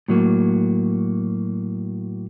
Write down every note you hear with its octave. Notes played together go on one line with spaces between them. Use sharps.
A2 F#3 A#3